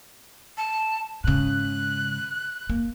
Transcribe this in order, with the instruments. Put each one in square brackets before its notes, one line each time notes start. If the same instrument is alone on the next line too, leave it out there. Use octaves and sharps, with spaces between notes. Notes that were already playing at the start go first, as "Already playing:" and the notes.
[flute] A5
[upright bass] G#2 C#3 [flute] F#6
[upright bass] A#3